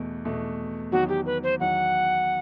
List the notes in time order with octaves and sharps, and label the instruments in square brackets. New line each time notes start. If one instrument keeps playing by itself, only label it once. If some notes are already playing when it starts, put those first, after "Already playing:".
Already playing: [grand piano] E2 B2 A3
E2 B2 A3
[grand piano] E2 D#3 F#3 [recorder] F#4
[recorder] G4
B4
C5
[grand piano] E2 D#3 F#3 [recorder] F#5